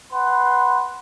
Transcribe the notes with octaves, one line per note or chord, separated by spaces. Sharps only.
B4 F#5 C6